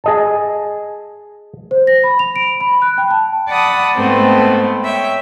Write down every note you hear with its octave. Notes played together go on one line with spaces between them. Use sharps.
G#4 D#5 A5
C5
A#6
B5
F7
D7
B5
F#6
G5
A5
D5 F#5 A5 B5 D#6
G#2 A3 B3 C4
C#5 E5 G5